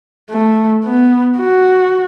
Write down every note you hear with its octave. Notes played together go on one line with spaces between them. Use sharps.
A3
B3
F#4